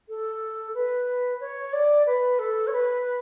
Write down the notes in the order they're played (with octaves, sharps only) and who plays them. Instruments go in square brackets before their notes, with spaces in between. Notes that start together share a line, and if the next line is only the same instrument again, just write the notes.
[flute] A4
B4
C#5
D5
B4
A4
C#5
B4